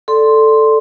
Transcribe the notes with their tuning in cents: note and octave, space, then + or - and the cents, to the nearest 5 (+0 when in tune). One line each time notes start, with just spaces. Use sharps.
A4 +0 D5 +0 C6 +0